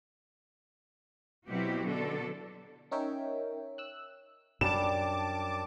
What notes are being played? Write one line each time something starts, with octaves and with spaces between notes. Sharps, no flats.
B2 F#3 C4 E4 F#4 G4
B2 D3 F#3 D4 A4
C#4 D#4 A#4 C#5 E5 G5
E6 F#6
F#2 G3 D4 A5 D6 E7